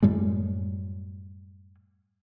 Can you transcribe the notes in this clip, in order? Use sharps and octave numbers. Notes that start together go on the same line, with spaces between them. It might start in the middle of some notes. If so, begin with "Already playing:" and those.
F#2 A2 G3 G#3